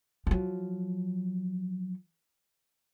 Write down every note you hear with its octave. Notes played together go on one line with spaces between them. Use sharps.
F3 F#3